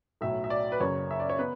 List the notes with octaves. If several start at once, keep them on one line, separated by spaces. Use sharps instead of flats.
B1 A2 F#3 E5
E5
D5
B4
F#1 F#2 C#3 C#5
E5
D5
C#5
B3 B4